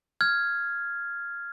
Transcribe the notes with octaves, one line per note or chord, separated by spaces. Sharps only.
F6 G#6